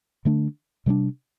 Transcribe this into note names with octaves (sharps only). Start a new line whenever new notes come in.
D3 A3 D4
C3 G3 A#3 D4